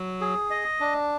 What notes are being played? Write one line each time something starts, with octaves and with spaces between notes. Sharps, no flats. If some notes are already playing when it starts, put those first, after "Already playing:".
Already playing: F#3
G#4
D#5
D4